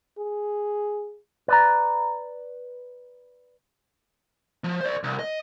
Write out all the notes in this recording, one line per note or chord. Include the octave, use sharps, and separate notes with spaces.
G#4
B4 D5 A#5
F3
C5 D5
C2
D#5